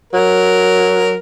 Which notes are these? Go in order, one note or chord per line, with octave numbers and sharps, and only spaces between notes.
F#3 A#4